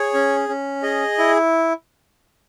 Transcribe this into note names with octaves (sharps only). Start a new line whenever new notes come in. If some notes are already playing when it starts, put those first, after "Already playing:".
Already playing: G#4 C#5
C#4
C#4
G#4 D#5
E4